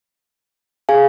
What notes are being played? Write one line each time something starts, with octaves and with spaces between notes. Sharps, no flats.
G#4 F5 G#5